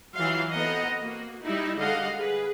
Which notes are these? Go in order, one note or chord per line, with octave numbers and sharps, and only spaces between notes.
E3 F#3 F4 F5 C6
B3 C4 A4 D#5 F#5 A#5
A#3 F#4
G3 D#4 E4
D3 G3 G#3 D#5 F5 F#5
G#4 B4